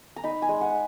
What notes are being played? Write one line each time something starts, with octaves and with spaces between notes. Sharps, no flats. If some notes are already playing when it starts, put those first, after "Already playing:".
A#5
D#4 B5
G#5
G#3
F#5